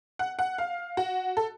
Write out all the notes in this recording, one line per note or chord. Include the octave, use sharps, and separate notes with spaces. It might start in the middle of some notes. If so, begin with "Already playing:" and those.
F#5
F#5
F5
F#4
A4